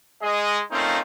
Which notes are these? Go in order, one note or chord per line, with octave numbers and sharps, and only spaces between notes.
G#3 G#4 D#5
A3 A#3 C4 C#4 D#4 F4